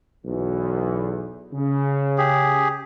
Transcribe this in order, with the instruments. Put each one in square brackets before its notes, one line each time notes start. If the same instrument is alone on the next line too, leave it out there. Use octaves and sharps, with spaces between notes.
[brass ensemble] B1 E2
C#3
[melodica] G4 G#4